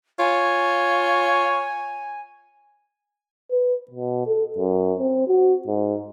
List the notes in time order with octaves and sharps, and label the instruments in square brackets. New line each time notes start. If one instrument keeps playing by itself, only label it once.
[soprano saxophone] F4 [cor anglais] C#5 [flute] G#5
[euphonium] B4
B2
A4
F#2
C4
F#4
G#2